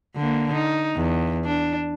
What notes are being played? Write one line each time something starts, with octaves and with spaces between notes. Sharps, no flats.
D3 A#3
D#4
E2
D4